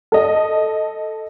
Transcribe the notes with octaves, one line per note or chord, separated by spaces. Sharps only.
A4 D#5